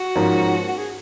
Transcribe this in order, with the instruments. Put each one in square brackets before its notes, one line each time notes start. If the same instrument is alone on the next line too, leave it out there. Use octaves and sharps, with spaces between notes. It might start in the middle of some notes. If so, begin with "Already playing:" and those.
Already playing: [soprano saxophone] F#4
[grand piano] G#2 F3 A#3 C#4
[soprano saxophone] F#4
G#4